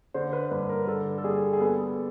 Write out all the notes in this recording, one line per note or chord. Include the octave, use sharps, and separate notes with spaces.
D3 C5
B4
G2 B4
A#4
D3 A4
A4
G3 G#4
G#4
B3 A4